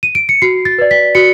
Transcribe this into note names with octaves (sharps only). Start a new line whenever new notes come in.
D#7
D7
C#7
F#4 C7
A6
B4 D5
B6
F#4 C#7